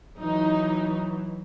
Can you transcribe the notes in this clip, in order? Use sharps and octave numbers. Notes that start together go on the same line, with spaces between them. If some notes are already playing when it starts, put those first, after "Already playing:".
E3 F#3 D#4